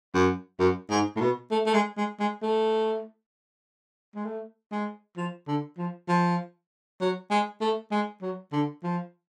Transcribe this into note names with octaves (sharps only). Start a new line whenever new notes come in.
F#2
F#2
G#2
A2
B2
A3
A3
G#3
G#3
G#3
A3
G#3
A3
G#3
F3
D3
F3
F3
F#3
G#3
A3
G#3
F#3
D3
F3